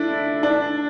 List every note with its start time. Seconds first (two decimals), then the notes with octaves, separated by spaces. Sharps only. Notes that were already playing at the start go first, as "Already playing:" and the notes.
Already playing: A3 D4 E4
0.43 D4